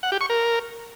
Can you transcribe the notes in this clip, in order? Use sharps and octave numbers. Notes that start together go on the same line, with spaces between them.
F#5
G4
C#6
A#4